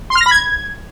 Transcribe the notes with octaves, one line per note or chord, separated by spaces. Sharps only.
C6
F6
A#6
B5
G#6